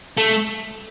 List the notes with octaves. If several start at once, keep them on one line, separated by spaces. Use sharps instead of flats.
A3